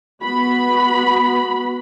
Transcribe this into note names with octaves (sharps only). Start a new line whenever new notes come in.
B3 F#4 B5